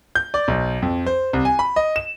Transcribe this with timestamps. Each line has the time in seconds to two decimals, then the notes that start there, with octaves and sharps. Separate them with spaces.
0.15 G6
0.34 D5
0.48 B1
0.82 F2
1.06 C5
1.33 C2
1.45 G#5
1.59 B5
1.76 D#5
1.96 E7